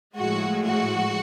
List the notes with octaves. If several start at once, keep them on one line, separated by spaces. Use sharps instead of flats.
A2 F3 G#3 F#4
F#4